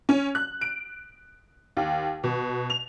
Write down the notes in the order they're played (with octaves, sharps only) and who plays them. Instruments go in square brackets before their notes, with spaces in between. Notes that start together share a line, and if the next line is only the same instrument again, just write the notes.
[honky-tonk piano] C#4
F#6
D7
D#2
B2
F7